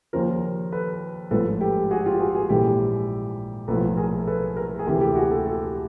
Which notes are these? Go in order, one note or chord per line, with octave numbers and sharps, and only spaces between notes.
D#2 C#3 F3 A#4 C5
A4 B4
A1 G#2 F3 A4 B4
G4 A4
F#4 G#4
F4 G4
F#4 G#4
F#4 G#4
A#1 G#2 E3 G4 A4
B1 A2 F3 A4 B4
G#4 A#4
A4 B4
G#4 A#4
G#4
D2 C3 E3 G4 A4
G4 A4
F#4 G#4
G4 A4
G4 A4